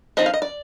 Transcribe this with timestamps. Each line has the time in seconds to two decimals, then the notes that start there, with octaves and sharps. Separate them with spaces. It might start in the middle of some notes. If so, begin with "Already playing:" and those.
0.17 F3 C4 D#4 D#5
0.26 F5
0.34 D#5
0.42 D5